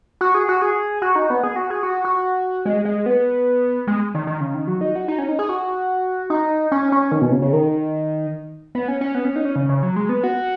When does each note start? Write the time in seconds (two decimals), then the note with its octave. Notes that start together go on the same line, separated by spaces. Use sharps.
0.21 F#4
0.35 G#4
0.49 F#4
0.62 G#4
1.02 F#4
1.16 D#4
1.30 B3
1.44 G#4
1.56 F#4
1.70 G#4
1.83 F#4
2.05 F#4
2.66 G#3
2.85 G#3
3.06 B3
3.87 G#3
4.14 D#3
4.27 D#3
4.41 C#3
4.55 D#3
4.67 F#3
4.81 D#4
4.96 F#4
5.08 D#4
5.19 C#4
5.29 D#4
5.39 G#4
5.49 F#4
6.30 D#4
6.72 C#4
6.92 C#4
7.12 D#3
7.21 B2
7.32 C#3
7.42 C#3
7.53 D#3
8.75 B3
8.88 C#4
9.01 C#4
9.15 B3
9.25 C#4
9.36 D#4
9.45 C#4
9.56 C#3
9.69 C#3
9.83 F#3
9.96 G#3
10.09 B3
10.24 F#4